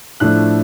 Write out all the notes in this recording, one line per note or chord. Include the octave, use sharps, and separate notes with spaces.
A2 F3 A3 D4 F#6